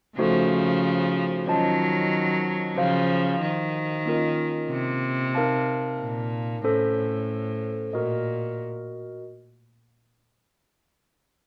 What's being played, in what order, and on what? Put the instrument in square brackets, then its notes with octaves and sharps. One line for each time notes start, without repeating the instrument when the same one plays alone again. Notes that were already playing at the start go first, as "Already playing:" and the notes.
[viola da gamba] C#3 F3 [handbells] A3 D#4 F#4 A4 C5
[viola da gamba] D#3 F#3 [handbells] C#4 F4 C5 D#5 A5
[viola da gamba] C#3 F3 [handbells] F#4 C5 F5
[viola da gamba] D#3
[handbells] A#3 C#4 F4 A#4 D#5
[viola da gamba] C3
[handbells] D#4 A#4 F5 A5
[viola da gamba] A#2
[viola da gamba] A2 [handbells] C#4 A4 C5
[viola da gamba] A#2 [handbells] F#4 A#4 D#5